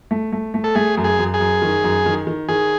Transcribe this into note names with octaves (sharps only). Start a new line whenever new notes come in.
A3
A3
A3
A4
A3 G#4
F#2
G#4
F#2
G#4
F#2
D#3
F#2
D#3
D#3
D#3 G#4